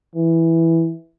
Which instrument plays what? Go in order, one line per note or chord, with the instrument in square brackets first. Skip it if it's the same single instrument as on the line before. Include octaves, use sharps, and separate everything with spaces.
[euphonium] E3